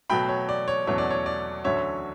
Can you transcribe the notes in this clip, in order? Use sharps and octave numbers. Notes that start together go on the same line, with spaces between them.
B2 F#3 A3 G5 B5
C#5
D5
C#5
E2 B2 F#3 A3 C#4 C#5
D5
C#5
D5
D2 D3 F#3 C#4 C#5 E5